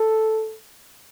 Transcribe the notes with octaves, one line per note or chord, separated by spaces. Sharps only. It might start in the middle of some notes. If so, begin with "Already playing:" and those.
Already playing: A4